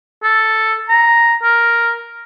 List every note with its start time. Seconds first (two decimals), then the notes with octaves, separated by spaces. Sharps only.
0.23 A4
0.89 A#5
1.43 A#4